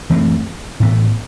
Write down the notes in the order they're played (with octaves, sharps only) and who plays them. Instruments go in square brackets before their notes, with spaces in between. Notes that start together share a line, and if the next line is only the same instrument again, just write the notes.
[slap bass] F#2 E3 A3 C4
A2 E3 B3